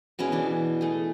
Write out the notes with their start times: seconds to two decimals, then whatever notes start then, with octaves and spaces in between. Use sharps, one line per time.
0.19 B2 C#4 E4 G#4
0.32 E3 D4
0.81 A3 G#4